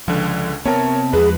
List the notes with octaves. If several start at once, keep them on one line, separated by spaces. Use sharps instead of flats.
C#2 D3 F3
C3 B3 C4 A#4 C#5 E5 A5
E2 F3 G#3 G#4 B4